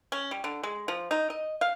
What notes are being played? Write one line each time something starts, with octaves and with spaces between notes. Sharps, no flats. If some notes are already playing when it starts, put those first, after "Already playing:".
C#4
G3
D3
G#3
F3
D#4
D#5
F5